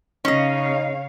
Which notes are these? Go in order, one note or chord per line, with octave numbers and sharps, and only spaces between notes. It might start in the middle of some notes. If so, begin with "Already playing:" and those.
C#3 C#4 D#4 C#5 D#5 F5